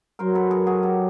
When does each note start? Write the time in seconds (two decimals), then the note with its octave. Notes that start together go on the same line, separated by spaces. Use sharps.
0.19 F#3 A#4 C5
0.35 A4 B4
0.51 G#4 A#4
0.67 F#4 G#4
0.83 G4 A4